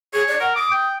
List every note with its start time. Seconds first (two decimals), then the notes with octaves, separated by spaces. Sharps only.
0.14 G#4 C#5
0.28 D5
0.40 A#4 F#5
0.55 D6 D#6
0.72 G5